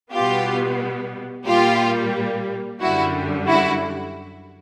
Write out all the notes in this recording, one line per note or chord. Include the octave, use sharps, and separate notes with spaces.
B2 G3 B3 F4 G4
A#2 G3 A#3 F4 G4
F#2 D3 G3 E4 F#4
E4 F#4